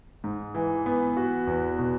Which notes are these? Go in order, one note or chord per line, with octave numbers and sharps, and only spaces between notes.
G#2
E3
B3
F#4
E2
B2